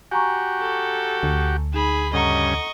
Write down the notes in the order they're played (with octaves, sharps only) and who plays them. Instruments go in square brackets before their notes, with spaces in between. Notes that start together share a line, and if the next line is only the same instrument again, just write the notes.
[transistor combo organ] F#4 G4 [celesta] G#5 A#5 C#6
[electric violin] A4
[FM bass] D2
[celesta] D#4 E7 [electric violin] G#4 B5
[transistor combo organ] G2 C#3 [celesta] A4 F#5 A#5 [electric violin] D#5 C#6